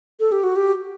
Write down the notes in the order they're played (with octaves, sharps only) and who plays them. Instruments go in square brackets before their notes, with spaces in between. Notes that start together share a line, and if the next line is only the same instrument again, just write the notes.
[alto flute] A4
G4
F#4
G4